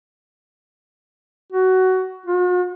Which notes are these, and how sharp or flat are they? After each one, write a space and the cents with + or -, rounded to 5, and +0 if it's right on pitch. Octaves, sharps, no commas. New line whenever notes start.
F#4 +15
F#4 -45